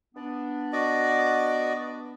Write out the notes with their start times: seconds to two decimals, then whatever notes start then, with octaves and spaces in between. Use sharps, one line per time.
0.15 B3 D4
0.73 F#4 D5 D#5